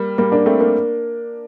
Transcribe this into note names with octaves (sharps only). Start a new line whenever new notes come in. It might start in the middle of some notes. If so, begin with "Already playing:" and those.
Already playing: G3 A#3
G3 A#3
A#3 D4
A3 C4
A#3 D4